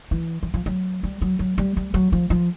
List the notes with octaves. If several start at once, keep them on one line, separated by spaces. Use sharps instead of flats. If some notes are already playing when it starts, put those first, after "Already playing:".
E3
E3
F3
F#3
G3
F#3
F#3
G3
G3
F#3
F3
F3